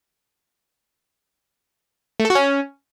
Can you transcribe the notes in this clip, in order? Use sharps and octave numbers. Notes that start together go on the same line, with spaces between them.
A3
A4
F#4
C#4